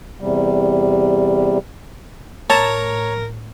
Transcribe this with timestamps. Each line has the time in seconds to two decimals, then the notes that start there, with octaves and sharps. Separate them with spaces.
0.20 E2 C3 G3
2.50 A2 A#4 C#5 A5 A#5